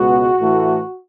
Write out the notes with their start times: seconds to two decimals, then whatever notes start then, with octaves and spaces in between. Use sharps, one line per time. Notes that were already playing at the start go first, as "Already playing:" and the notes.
Already playing: C#2 B2 G#3 B3 F#4
0.40 A2 E3 A3